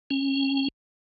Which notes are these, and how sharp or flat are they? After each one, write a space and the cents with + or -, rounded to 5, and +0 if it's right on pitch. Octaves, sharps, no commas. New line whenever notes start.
C#4 -25